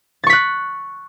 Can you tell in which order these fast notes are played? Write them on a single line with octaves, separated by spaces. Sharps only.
A6 C#6 B6 F#6